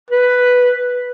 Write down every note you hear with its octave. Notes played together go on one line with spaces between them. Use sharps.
B4